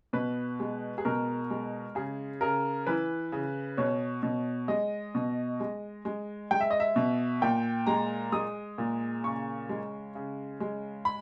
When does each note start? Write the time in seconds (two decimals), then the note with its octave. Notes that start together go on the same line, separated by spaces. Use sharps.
0.13 B2 B4
0.60 G#3
0.98 G#4
1.05 B2 A#4
1.50 G#3
1.95 C#3 G#4
2.41 C#3 A#4
2.87 E3 B4
3.32 C#3
3.77 B2 C#5
4.23 B2
4.68 G#3 D#5
5.15 B2
5.60 G#3
6.05 G#3
6.51 G#3 G5
6.60 E5
6.71 D#5
6.80 E5
6.96 B2
7.42 A#2 G5
7.87 G#3 A#5
8.32 G#3 D#6
8.78 A#2
9.23 C#3 C#6
9.69 G#3
10.15 C#3
10.60 G#3
11.05 B5